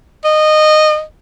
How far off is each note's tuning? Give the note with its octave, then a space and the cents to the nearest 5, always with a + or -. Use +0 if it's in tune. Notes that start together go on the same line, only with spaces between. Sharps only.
D#5 -15